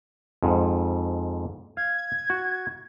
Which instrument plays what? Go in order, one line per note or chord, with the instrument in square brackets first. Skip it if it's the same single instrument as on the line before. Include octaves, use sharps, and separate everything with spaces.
[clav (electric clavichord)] F2 G#2
[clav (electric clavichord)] F5 [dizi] G#6
[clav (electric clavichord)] F#4